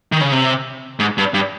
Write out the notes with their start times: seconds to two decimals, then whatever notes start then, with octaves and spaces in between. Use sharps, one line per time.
0.12 D#3
0.21 C#3
0.32 C3
0.99 G#2
1.18 G2
1.34 G2